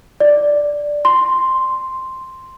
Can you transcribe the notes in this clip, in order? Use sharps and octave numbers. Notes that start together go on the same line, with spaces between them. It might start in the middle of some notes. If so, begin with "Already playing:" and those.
D5
C6